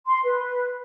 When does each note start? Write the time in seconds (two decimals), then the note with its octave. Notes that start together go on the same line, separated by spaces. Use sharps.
0.06 C6
0.24 B4